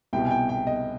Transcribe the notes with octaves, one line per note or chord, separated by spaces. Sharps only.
C2 B2 G5
G#5
G5
G5
D#5